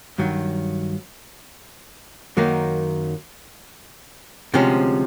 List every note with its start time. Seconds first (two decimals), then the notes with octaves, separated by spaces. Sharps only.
0.18 G2 D#3 F#3
2.37 F#2 D#3 F#3 A#3 D#4
4.54 D2 C3 F3 G#3 C#4